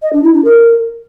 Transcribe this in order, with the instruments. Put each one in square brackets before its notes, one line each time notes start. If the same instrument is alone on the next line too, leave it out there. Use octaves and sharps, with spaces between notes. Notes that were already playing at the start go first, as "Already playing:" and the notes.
[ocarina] D#5
D4
E4
D4
A#4